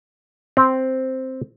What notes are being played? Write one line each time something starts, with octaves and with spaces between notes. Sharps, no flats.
C4